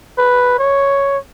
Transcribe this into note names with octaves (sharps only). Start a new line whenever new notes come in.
B4
C#5